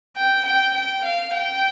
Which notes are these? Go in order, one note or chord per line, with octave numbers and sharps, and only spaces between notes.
G5
G5
G5
F5
G5